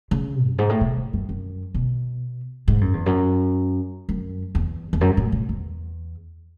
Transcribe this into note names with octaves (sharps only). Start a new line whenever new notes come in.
C#3
F#2
G#2
A2
B2
A2
F#2
F#2
B2
G#2
F#2
E2
F#2
F#2
E2
E2
F#2
A2
A2
E2